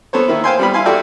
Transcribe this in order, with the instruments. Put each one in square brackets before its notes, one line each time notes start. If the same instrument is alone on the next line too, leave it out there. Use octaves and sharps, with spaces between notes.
[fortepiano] B3 A4 C5 C#5
D#3 A#3 E4
C5 F5 G5 G#5 C6
G3 B3 B5
E4 F5 G#5 C6
F#4 G4 A4 D5 E5 G5